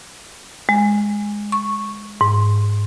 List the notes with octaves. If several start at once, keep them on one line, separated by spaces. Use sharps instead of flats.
G#3
C#6
G#2